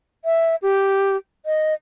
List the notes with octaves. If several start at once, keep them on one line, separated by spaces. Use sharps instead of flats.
E5
G4
D#5